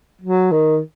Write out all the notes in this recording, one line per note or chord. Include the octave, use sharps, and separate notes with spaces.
F#3
D#3